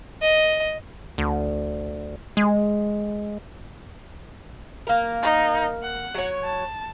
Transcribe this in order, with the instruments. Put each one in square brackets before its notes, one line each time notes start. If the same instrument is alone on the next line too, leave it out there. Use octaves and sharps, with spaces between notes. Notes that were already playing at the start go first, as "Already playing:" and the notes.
[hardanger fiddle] D#5
[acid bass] D2
G#3
[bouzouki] A#3 A#4
[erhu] D#4
F#5
[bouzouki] F#3 C#5
[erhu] A5